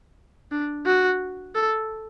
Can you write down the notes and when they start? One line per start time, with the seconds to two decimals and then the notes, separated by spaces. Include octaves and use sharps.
0.52 D4
0.86 F#4
1.55 A4